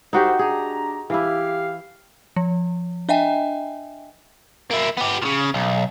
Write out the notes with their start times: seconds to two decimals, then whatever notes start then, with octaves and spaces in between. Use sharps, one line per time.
0.13 C2 D#4 F#4 G4 A4 C5
0.39 D4 G4 G#4 A#5
1.10 E3 E4 G4 F5
2.36 F3
3.09 D4 D#5 E5 G5 G#5
4.71 A#3 E4
4.97 B3 G4
5.22 A#2 C#3
5.54 B1